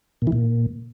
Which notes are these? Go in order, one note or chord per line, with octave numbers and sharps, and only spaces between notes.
A#2
E3
A#2